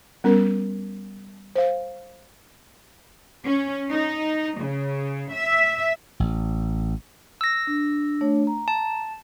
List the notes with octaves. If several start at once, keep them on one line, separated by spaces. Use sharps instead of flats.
G3 B3 C#4 A#4
C5 F5
C#4
D#4
C#3
E5
A1
E6 A#6
D4
A3 D4 C#5
A#5
A5